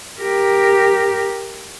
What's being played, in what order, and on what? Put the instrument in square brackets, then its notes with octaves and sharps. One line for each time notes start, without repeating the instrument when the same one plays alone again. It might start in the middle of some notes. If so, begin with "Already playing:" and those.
[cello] G4 A#4